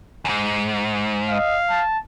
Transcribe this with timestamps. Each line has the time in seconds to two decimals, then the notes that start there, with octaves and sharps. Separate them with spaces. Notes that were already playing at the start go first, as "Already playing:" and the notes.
0.25 E2 G#2
1.30 D#5 F5
1.70 A5